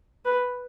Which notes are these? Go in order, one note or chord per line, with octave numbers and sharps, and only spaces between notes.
B4